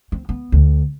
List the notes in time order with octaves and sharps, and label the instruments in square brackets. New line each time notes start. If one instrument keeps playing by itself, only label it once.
[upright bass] C4
B3
D2